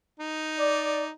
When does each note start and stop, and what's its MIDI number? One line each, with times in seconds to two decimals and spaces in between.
0.20 1.11 63
0.58 1.05 74